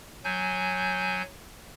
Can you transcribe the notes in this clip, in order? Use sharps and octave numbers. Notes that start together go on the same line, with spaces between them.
F#3 G#5 G6